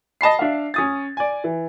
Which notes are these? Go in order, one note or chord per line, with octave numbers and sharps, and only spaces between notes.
D#5 A5 B5 C7
D4 E5 F5
C#4 D#6 A6
D5 G#5
E3